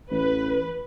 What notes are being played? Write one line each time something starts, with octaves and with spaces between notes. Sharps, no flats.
A1 B4